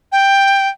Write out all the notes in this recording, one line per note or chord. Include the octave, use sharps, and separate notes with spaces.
G5